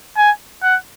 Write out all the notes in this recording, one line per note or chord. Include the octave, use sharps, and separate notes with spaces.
G#5
F#5